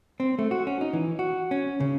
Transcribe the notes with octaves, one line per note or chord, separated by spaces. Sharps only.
C4
A3
F#4
C#4
D#4
E3
F#4
C#4
C#3